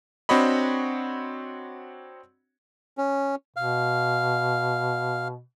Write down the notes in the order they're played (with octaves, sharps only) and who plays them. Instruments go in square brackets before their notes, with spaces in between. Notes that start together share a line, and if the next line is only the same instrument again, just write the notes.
[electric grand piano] C4 D4 F#4 C#5 D#5 B5
[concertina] C#4
[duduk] B2 [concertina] F5